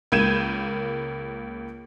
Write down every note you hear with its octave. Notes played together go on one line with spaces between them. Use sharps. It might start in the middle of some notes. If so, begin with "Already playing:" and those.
C#2 A#3 G6 G#6 D#7 E7